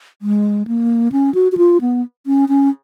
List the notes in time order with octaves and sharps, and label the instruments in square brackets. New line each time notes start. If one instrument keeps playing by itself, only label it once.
[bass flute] G#3
A#3
C#4
F#4
F#4
F4
B3
C#4
C#4